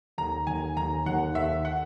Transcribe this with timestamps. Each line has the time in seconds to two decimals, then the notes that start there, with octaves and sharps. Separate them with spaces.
0.18 D#2 A#5
0.47 D#2 G#5
0.77 D#2 A#5
1.06 D#2 F#5
1.35 D#2 E5
1.65 F#5